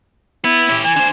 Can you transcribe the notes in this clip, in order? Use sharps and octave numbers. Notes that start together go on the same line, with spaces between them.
B3 E4
C#4 G4
E3 G#5
D3 C5